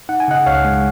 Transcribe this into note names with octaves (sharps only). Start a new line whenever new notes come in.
D#4 F#5
G#5
C#3 D#5 F#5
C#2 C#5 F5
G#3